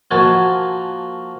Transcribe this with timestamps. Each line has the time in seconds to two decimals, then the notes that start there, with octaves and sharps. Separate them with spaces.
0.11 F3 A#3 F#4 D#5 G#5 A5